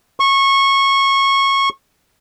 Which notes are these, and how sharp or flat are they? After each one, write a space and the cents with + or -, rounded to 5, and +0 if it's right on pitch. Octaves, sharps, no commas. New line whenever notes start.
C#6 -20